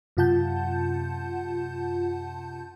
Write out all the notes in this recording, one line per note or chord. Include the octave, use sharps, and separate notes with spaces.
F#2 C3 F4 F#5 A5 G6